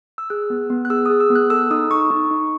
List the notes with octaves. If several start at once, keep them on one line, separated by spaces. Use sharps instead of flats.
E6
G#4 F#6
B3
B3
F#6
G#4 E6
G#4 D#6
E6
B3
F#6
A4 E6
D#4 D#6
D#4 C#6
D#4
D#4